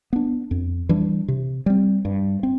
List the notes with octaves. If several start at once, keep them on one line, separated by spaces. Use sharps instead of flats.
B3 D4
F2
E3 G3 D4
C3
G3 C4
G2
C4